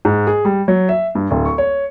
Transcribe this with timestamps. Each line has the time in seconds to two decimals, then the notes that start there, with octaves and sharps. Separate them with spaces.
0.05 G#2
0.27 G#4
0.45 G3
0.68 F#3
0.89 E5
1.15 G2
1.31 D1
1.45 C#6
1.58 C#5